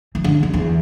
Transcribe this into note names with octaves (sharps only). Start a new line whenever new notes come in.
E3
D3
D3
E2